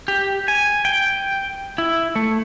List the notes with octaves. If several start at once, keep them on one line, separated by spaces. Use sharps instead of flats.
G4
G#5
G5
E4
A3